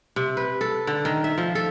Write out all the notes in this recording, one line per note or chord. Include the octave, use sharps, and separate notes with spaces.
C3
B4
A4
D3
D#3
E5
F3
A4